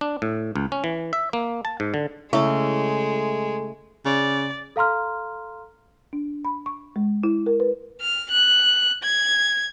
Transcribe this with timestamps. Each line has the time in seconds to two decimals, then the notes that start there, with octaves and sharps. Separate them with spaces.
0.01 D4
0.22 A2
0.56 C#2
0.72 C#4
0.84 E3
1.13 E5
1.33 A#3
1.65 A5
1.80 G#2
1.94 D3
2.33 C#3 G#3 A3 E4 E5 C#6 D6
4.05 C#3 D5
4.76 A4 F5 A#5 C6 F6
6.13 D4
6.45 B5
6.66 C#6
6.96 G#3
7.24 E4
7.46 A#4
7.60 B4
8.01 F6
8.31 F#6
9.04 G#6